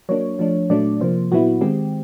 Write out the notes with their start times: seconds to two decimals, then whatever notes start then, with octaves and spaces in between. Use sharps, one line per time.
0.09 F#3 A#3 D4 C#5
0.39 F3 A3 D4
0.70 A#2 F#3 A3 D4 D5
1.00 C3 F3 A#3 C5
1.31 A#2 F#3 B3 E4 F#4
1.61 D#3 G#3 C4 G4